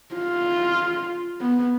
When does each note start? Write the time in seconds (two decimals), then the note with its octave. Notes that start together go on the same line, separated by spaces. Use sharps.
0.15 F4
1.41 B3